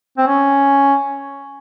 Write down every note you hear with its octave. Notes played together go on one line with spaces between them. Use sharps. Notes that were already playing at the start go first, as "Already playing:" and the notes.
C4
C#4